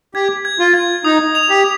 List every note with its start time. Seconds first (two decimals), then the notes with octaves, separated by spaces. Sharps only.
0.15 G4 G#6
0.45 G#6
0.59 F4
0.74 G#6
1.05 D#4 D#6
1.35 F7
1.50 G4